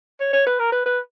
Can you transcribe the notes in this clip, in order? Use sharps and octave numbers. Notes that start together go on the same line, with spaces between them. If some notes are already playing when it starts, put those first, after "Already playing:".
C#5
C#5
B4
A#4
B4
B4